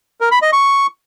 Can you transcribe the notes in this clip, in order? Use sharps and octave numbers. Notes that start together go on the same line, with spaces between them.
A#4
B5
D#5
C#6